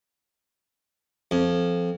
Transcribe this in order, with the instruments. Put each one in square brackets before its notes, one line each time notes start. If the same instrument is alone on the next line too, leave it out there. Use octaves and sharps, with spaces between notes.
[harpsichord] F2